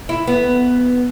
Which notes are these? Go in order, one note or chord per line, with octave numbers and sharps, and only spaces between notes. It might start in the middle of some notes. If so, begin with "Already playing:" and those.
E4
B3